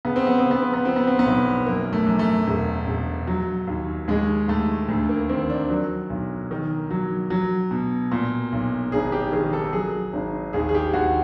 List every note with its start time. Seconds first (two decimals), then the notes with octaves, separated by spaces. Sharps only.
0.05 C#3 B3
0.16 C4
0.27 B3
0.38 C4
0.45 C#3
0.51 B3
0.62 C4
0.74 B3
0.85 F3 C4
0.96 B3
1.07 C4
1.19 B3
1.26 B1
1.66 F#2 A#3
1.93 A3
2.06 F#2
2.19 A3
2.47 E1
2.87 E1
3.27 F#3
3.67 D#2
4.08 D#2 G#3
4.48 D#2 A3
4.89 D2 A3
5.09 A#3
5.29 D#3 C4
5.50 D4
5.70 F#3
6.10 B1
6.51 D#3
6.90 F#3
7.30 F#3
7.71 B2
8.11 A#2
8.52 B1
8.92 G#1 G#4
9.12 G4
9.32 D#3 G#4
9.53 A4
9.72 F#3 G#4
10.13 G#1
10.53 D#2 G#4
10.69 G#4
10.74 G4
10.94 D#2 F#4